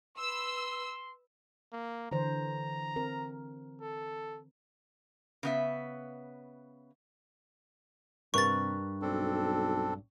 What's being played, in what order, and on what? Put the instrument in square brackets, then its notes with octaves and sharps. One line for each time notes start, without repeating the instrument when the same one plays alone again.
[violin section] B4 E6 [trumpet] C6
[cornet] A#3
[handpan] D3 E3 C5 [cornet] A#5
[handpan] C4 A#4
[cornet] A4
[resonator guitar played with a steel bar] C#3 B3 E5
[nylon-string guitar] G2 A#4 B4 [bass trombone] C3 [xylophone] C#6 A6
[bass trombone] B1 [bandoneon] C4 D4 A4